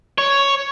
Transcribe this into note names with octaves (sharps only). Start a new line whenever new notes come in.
C#5